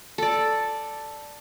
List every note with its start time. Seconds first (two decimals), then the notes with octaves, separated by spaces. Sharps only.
0.18 A4 D5